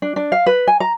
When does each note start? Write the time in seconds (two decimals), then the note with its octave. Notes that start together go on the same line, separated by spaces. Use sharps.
0.02 D4
0.16 D4
0.32 F5
0.46 B4
0.67 G#5
0.80 A#5